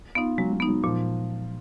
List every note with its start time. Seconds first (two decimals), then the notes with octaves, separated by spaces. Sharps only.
0.15 B3 D#4 F4
0.38 F#3 G#3
0.53 F#3
0.60 B3 D#4
0.68 F#3
0.84 A#2 F3